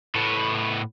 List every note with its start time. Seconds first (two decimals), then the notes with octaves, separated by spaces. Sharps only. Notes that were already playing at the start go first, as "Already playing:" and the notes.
0.15 A2 B3